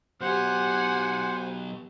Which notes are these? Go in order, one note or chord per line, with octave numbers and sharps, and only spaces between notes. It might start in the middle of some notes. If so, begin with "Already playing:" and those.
F#3 B3 G4 C5 F#5 G#5